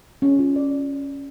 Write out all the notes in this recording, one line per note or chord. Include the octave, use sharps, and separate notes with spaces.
C#4
F4
D5